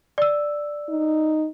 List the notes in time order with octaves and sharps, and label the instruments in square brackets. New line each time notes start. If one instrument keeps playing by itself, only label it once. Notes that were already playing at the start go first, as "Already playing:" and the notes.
[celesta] D5 E6
[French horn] D#4